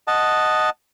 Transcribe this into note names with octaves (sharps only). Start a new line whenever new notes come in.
D#5 F#5 A5